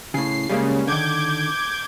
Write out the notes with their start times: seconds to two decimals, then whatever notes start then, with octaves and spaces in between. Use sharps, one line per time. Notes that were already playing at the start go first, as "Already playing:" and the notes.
0.14 A2 C#3 C7
0.49 C#3 G3 G#3 A#3
0.87 D3 D#3 D6 G6 G#6